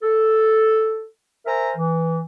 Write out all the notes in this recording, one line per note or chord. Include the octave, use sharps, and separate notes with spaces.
A4
A#4 C5 E5 G#5 A#5
E3